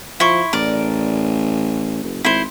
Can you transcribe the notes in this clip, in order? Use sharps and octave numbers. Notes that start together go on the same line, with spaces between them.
F3 E4 C6 C#6
A1 A#4 D5
F#1
G#1 E4 C5